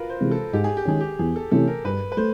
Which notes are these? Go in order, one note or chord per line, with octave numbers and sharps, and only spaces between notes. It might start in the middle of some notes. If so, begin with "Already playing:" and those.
Already playing: F4 F#4 A#4 B4
C5
C3 E3 G#3
A4
G#2 G4
G#4
G4
D#3 G#3 C#4 G#4
G4
E2 G#4
A4
C3 E3 A3 C#4 A4
A#4
G2 B4
B4
A3 C5